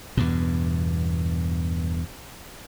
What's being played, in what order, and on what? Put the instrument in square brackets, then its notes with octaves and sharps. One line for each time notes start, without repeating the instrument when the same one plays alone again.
[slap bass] E2 G2 B2